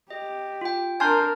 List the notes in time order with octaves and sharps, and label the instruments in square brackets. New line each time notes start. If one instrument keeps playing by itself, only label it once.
[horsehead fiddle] G4 [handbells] D#5
[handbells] F4 G5
[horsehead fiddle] D4 A#4 [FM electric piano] G#5 C6 G6 [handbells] A5 F6